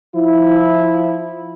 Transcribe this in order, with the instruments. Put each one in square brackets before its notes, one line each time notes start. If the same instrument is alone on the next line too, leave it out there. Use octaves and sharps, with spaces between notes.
[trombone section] F3 E4